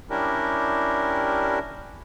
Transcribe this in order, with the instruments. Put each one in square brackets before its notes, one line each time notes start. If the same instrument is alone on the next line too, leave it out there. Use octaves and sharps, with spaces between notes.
[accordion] G3 C#4 D4 E4 G4 A#4